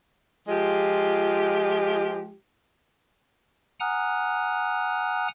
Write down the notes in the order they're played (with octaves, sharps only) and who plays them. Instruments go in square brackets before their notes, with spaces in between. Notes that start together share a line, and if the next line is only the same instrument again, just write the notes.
[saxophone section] F3 G#3 F4 G4
[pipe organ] F#5 G#5 A#5 D#6 F6 F#6